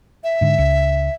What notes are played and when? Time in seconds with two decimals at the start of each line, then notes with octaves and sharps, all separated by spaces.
0.24 E5
0.41 G#2 D3
0.58 C#2